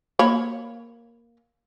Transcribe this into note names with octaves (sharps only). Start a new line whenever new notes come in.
A#3 C#5 B5